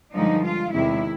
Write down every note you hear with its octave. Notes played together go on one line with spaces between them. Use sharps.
G2 D3 F3 G#3 D#4
F4
E2 C3 D#3 G#3 E4